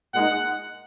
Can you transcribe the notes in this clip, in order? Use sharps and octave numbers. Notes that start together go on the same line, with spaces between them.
A#2 G#3 D#4 F#5